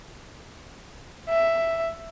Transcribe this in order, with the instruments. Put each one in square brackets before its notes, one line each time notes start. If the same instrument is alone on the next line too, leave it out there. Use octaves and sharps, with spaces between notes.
[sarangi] E5